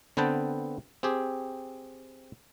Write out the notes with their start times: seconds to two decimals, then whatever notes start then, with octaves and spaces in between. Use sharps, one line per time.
0.17 D3 B3 C4 B4 G5 A5
1.03 C4 G4 G#4